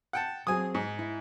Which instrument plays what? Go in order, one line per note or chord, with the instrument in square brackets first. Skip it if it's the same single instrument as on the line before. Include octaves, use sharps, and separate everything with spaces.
[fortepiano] F#5 G5 A5
[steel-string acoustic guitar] F#3 C4 G#4 [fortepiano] G#5 D#6
[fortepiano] G#2
[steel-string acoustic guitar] E4